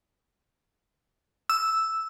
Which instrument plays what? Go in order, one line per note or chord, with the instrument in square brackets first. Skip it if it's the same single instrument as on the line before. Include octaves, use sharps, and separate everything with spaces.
[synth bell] E6